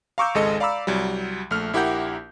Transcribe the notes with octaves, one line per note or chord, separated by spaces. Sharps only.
F5 A#5 C#6 D6 E6 G6
G#1 C#2 G#3 A4 D#5 C#7
D5 F5 A#5 B5 D6 E6
C2 F#3 G3
A#1 A3 F6
A#1 E4 G4 A#4 F#5 G6